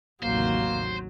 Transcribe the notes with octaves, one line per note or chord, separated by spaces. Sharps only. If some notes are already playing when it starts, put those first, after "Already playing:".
A1 D#2 C3 F#3 A#3 C5